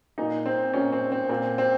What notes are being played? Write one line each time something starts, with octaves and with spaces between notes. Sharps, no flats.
A#2 D#4
C4
A#2 C#4
C4
C4
A#2 C4
C4